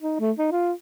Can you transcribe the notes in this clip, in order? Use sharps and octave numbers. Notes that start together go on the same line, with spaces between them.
D#4
A3
D#4
F4